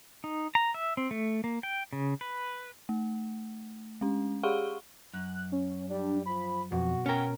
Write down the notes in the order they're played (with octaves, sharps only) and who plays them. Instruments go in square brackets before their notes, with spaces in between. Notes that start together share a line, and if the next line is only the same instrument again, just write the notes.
[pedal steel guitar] D#4
A#5
E5
C4
A3
A#3
G5
C#3
B4
[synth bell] A3
G#3 C#4
G4 G#4 F5 F#5 C#6 G7
[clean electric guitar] F#2 [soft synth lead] F#6
[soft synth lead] C#4
[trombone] G3 [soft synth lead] D4
[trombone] F3 [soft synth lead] B5
[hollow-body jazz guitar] F2 [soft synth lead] B2 [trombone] F#4
[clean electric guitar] B3 G5 [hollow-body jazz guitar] C#4 A#4